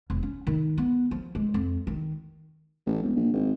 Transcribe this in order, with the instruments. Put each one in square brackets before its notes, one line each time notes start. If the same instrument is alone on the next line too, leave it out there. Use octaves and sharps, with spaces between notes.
[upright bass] E1
C#4
D#3
B3
F3
G#3
F2
D#3
[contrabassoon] A1
E1
A#1
G#1